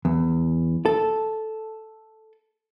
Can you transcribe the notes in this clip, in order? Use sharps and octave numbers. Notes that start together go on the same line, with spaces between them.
E2
A4